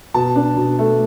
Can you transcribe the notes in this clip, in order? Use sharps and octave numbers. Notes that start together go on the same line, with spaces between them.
B2 A5
D4
B2
A3